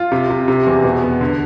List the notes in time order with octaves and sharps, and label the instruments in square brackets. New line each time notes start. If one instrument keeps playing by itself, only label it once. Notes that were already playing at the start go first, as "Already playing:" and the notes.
Already playing: [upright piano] F4
C3
C3
C3
E2
B2
B3
D3